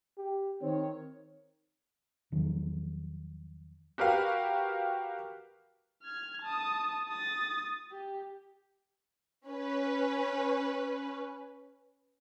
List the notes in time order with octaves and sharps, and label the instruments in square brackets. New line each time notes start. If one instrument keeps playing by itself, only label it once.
[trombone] G4
[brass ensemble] D#3 C#5 [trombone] C4
[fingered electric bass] E2 D#3 F3 F#3
[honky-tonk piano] F#4 G4 A#4 B4 F5
[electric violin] F6 G#6
A5 D#6
D#6 A6
G4
[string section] C#4 B4